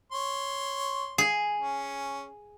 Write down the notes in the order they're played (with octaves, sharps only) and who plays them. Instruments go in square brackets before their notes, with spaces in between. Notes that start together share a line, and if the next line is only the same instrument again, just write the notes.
[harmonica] C#5 C6
[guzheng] G#4
[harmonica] C#4